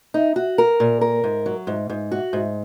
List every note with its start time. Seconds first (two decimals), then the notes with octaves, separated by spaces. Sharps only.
0.14 D#4
0.36 F#4
0.58 A#4
0.80 A#2
1.01 A#4
1.24 G#2
1.46 F#3
1.67 G#2
1.90 G#2
2.11 F#4
2.33 G#2